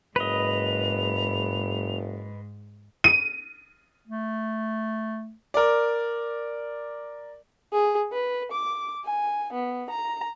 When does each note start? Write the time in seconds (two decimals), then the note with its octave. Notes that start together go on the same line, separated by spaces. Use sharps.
0.16 F#1 G#2 B4 D#5 F7
3.04 D#7
4.07 A3
5.54 A#4 D5
7.73 G#4
8.12 B4
8.52 D6
9.05 G#5
9.53 B3
9.90 A#5